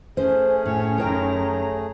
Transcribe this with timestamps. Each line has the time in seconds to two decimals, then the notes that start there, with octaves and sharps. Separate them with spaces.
0.17 A3 C#4 G#4 C5
0.66 A2 C#5
0.98 F#2 D#3 A#4 C#5 G5 A#5